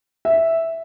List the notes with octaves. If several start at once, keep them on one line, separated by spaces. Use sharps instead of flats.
E5